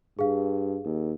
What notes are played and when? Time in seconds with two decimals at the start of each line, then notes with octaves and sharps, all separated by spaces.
0.19 G2 G#4 F5
0.85 D#2